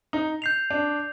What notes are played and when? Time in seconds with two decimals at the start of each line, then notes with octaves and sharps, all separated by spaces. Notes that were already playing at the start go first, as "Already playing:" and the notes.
0.13 D#4
0.42 G6 C7 F7
0.70 D4